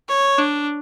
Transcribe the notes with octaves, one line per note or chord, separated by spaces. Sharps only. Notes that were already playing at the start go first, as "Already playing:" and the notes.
C#5
D4